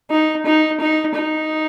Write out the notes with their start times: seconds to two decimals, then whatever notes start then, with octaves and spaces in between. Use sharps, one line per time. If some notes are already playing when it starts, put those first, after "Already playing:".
0.10 D#4
0.46 D#4
0.80 D#4
1.15 D#4